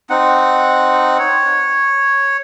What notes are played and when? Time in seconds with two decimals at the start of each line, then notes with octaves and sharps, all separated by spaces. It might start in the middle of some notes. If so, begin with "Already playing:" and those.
0.10 C4 D#4 F#5
1.20 C#5